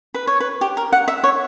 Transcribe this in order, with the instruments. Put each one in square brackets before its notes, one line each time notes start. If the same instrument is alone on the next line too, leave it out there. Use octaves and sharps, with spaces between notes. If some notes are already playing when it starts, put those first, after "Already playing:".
[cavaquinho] B4
C#5
B4
G4
A#4
F#5
E5
C#5